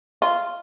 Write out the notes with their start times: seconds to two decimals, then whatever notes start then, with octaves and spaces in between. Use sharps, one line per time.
0.22 F4